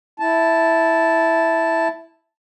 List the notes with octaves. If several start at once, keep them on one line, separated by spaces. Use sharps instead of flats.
E4 A5